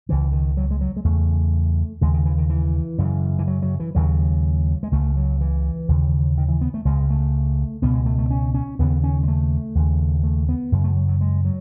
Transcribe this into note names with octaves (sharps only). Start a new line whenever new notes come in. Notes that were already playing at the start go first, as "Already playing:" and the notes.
C#2 C#3 E3
D#3
F#3
G#3
F#3
G#3
E2 C#3 A3
D#2 C#3 G#3
D#3
E3
D#3
E3
F#2 C#3
E3
F#3
F#3
E3
D#2 C#3 F#3
G#3
C#2 C#3 A3
F#3
E3
D#2 C#3
D#3
E3
B3
A3
C#2 C#3 G#3
A3
C#2 B2 B3
G#3
A3
A3
C#4
C#4
D#2 C#3 B3
C#4
G#3
A3
D#2 C#3
A3
B3
F#2 C#3
A3
F#3
F#3
G#3
F#3